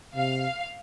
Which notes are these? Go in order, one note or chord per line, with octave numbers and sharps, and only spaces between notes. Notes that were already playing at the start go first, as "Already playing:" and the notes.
C3 F5